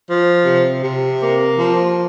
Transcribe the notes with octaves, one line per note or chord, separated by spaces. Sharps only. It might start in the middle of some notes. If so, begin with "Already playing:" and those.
F3
C3
C3
A#3
F3